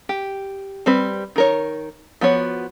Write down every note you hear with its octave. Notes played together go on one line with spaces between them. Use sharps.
G4
G3 C4 B4
D#3 A#4 C#5
F3 B3 F#4 C#5